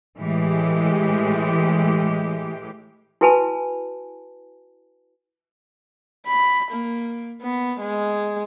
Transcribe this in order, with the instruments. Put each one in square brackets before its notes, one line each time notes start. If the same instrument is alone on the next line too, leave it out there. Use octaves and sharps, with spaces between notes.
[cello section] A2 E3 G#3 G4
[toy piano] E4 F#4 B4 G#5 A5 B5
[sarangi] B5
A#3
B3
G#3